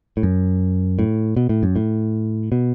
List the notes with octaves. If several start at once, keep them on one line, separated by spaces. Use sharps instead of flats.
A2
F#2
A2
B2
A2
F#2
A2
B2